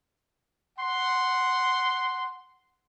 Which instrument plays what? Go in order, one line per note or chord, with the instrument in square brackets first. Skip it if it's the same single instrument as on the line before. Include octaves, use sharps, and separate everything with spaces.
[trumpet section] F#5 C6